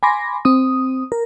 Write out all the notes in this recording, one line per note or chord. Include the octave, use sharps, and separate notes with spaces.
G#5 B5 C6 D6 A#6
C4 D#6
A#4